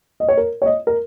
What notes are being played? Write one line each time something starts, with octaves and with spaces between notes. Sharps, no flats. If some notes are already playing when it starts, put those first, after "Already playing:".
D#5
C#5
A#4
C#5
D#5
A#4